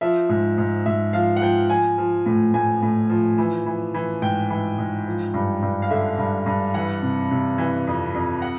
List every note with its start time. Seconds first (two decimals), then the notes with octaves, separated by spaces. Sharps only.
0.01 F3 E5
0.29 G#2
0.58 G#2
0.86 G#2 E5
1.13 F3 F5
1.36 F#5
1.42 F3 G5
1.70 F3 G#5
1.98 F3
2.26 A2
2.54 A2 G#5
2.82 A2
3.09 F3
3.38 E3
3.66 E3
3.94 E3
4.22 G#2 G5
4.50 E3
4.78 G#2
5.06 F3
5.34 G2
5.62 G2
5.82 F5
5.90 D3 E5
6.18 G2
6.46 G2
6.74 E3 F#5
7.02 C3
7.31 C3
7.58 E3
7.87 F2
8.14 F2
8.42 F#5